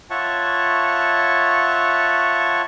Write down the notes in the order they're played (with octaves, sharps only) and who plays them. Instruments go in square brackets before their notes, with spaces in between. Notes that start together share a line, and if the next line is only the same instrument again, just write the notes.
[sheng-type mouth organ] F4 C#5 E5 F#5 A5 C#6